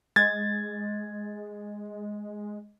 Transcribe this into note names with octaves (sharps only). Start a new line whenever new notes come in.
G#3 G#6 A6